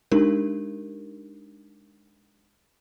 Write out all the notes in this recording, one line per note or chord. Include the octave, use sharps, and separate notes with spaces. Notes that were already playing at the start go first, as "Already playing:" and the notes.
G#3 D4 D#4 G4 A#4